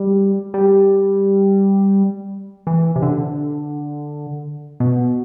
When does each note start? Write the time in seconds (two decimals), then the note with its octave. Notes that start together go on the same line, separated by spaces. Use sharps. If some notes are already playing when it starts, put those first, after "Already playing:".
Already playing: G3
0.54 G3
2.67 E3
2.96 C3
3.02 D3
4.80 B2